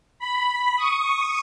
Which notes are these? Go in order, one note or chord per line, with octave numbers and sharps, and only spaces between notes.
B5
C#6 D#6